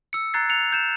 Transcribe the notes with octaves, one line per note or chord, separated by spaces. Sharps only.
E6 C#7
A#5 F#6 G#6 A6 C7
F#6 C#7 F7
G6 E7